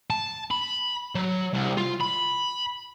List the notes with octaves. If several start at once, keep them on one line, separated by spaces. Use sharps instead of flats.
A5
B5
F#3
C2
F4
B5